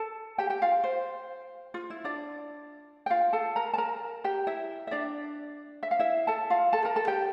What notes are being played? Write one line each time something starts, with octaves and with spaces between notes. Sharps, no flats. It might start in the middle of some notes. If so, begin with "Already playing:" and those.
Already playing: A4 A5
G4 G5
G4 G5
F4 F5
C5
F4
E4
D4 D5
G5
F4 F5
A4 A5
A#4 A#5
A5
A#4 A#5
G4 G5
E4 E5
E5
D4 D5
E5
F5
E4 E5
A4 A5
F4 F5
A4 A5
A#4 A#5
A4 A5
G4 G5